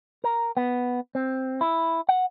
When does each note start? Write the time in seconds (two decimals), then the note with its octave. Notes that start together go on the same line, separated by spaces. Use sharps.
0.24 A#4
0.57 B3
1.15 C4
1.61 E4
2.09 F#5